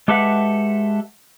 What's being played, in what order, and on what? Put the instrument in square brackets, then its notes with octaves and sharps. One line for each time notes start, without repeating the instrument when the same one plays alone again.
[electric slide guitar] G#3 G4 A4 B4 E5 F#5